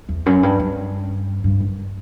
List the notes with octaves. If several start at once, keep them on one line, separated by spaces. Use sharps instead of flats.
E2
F#2
G2
G2
G2
F#2